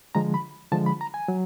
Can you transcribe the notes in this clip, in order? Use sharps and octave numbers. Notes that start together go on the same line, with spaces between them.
D3 F3 G#3 A#5
B5
D3 F3 G#3 A5
B5
A#5
G#5
F#3